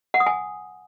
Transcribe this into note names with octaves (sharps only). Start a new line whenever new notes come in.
F#5
D#6
G#5